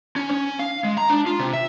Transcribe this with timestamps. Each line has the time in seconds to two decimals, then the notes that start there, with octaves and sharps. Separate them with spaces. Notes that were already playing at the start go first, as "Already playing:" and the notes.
0.16 C#4
0.31 C#4
0.59 F5
0.84 G#3
0.98 A#5
1.10 D4
1.26 F4
1.39 C3
1.53 E5